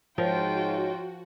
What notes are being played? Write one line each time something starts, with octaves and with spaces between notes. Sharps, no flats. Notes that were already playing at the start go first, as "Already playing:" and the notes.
G#2 F3 F4 F#4 A#4 C#5 G5